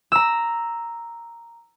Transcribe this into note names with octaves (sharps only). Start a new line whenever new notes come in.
A#5 E6